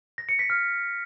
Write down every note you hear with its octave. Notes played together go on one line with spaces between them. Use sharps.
A#6
C#7
B6
F6